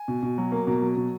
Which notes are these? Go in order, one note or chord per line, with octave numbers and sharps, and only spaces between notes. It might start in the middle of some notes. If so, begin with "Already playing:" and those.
Already playing: G#5
B2
B2
F#3
A#3
B2
F#3
B2